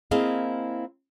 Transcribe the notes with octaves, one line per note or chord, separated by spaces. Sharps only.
A#3 C4 E4 G#4 D#5 F5